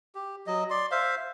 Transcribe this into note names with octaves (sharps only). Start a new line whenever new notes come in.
G4
F#3 D#5
D5 C6
C5 E5 F5